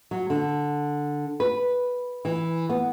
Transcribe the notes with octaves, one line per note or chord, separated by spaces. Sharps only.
F#3
D3
B4
E3
B3